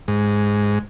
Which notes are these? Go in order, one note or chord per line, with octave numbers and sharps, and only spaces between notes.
G#2